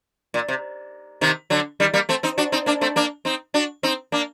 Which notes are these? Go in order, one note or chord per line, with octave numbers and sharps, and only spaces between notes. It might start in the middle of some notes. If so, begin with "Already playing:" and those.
A#2
C3
C3 D#3
D3 F#3
D#3 G3
G3 A#3
A3 C4
C4 D#4
D4 F#4
C4 D#4
A#3 D4
A3 C4
A#3 D4
C4 D#4
D4 F#4
C4 D#4
A#3 D4